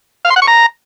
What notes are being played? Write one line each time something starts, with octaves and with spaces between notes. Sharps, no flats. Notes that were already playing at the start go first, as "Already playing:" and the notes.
F5
C6
F#5
C#6
A#5